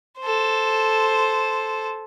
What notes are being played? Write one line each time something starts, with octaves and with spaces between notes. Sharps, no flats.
A4 C5